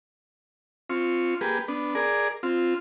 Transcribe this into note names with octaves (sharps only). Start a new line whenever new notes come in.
C4 F4 C#6
A#3 G4 G#4 B4
B3 D4
G#4 A#4 D5
C4 F4